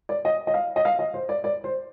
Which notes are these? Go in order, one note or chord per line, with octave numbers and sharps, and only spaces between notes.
D5
D#5
D#5
F5
D#5
F5
D#5
C5
D5
D5
C5